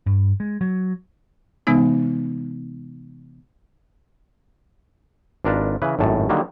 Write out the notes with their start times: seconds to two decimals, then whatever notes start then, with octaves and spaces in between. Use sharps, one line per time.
0.06 G2
0.40 G#3
0.61 F#3
1.67 C3 E3 G#3 B3 D#4
5.45 G#1 D4 F4 A#4 B4 A5
5.82 C#3 E3 B4
5.99 G#1 F#2 A2 A5
6.29 D3 D#3 F#3 G3 A#3